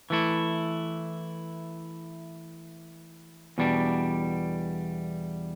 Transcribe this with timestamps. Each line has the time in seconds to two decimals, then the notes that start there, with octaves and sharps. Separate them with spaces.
0.10 E3 A3 E4
3.58 E2 B2 G3 D4